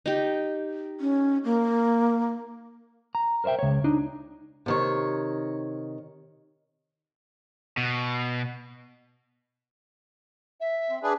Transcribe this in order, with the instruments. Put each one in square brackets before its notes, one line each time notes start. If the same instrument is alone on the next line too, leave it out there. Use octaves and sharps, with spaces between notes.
[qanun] D#4 G4
[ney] C#4
A#3
[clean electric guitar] A#5
A#4 C5 D5 E5 G5
C#2 C#5
D4 D#4
[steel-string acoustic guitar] C3 D#3 C#5
[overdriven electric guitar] B2
[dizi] E5
[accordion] C4
D4 G#4 B4